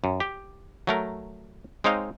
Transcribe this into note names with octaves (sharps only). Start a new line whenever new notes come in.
F#2
G4
F#3 A3 A#4
G#3 C4 D#4 C#5 D#5 F5